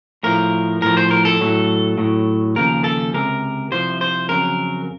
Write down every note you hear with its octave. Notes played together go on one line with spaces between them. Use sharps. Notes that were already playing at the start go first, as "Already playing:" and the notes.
A2 F3 A#4
A2 F3 A#4
C5
A#4
A4
A2 F#3
A2 F#3
D#2 C#3 F3 A#4
A4
C#2 C3 A#4
C2 C3 F3 C5
C5
F2 C#3 F#3 A#4